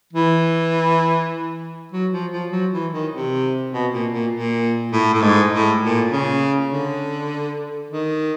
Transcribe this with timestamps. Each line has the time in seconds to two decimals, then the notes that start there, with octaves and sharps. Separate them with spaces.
0.13 E3
1.92 F#3
2.12 F3
2.32 F3
2.52 F#3
2.72 E3
2.92 D#3
3.12 C3
3.72 B2
3.92 A#2
4.12 A#2
4.32 A#2
4.92 A2
5.14 A2
5.21 G#2
5.52 A2
5.81 A#2
6.11 C#3
6.71 D3
7.90 D#3